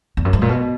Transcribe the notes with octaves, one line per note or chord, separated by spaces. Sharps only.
E2
F#2
G#2
A#2
B2